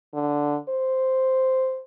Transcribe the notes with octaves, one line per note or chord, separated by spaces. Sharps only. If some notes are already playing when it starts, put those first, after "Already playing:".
D3
C5